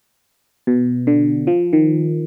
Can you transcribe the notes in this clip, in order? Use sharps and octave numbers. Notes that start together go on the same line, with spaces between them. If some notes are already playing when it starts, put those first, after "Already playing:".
B2
D3
F3
D#3